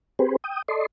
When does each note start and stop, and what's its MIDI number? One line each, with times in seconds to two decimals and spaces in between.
0.19 0.36 60
0.19 0.36 67
0.19 0.36 68
0.19 0.36 71
0.19 0.36 72
0.44 0.62 79
0.44 0.62 87
0.68 0.86 69
0.68 0.86 74
0.68 0.86 75
0.68 0.86 84